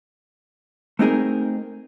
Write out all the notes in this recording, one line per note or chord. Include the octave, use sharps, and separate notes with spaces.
A3 C4 D#4 G#4 A#4